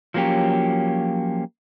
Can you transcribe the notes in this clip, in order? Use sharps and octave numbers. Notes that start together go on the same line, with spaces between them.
F3 F#3 A#3 C#4 G4